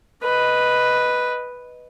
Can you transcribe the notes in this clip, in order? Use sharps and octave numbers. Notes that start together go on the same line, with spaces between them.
B4 D#5